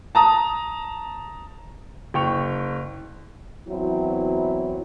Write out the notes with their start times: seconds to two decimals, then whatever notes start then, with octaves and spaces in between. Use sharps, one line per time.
0.15 A5 A#5 D#6
2.14 F#1 G5 C#6 F7
3.67 E2 F#3 C4 E4